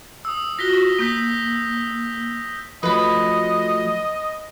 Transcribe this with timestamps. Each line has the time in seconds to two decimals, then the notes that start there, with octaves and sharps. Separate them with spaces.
0.25 D#6 E6
0.59 F4 F#4 A#6 B6 G7
0.99 A#3 D#6 G6 B6
2.83 F3 F#3 A3 B4 D#5 B5